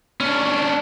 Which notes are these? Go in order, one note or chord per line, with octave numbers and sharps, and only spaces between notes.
C#4 D4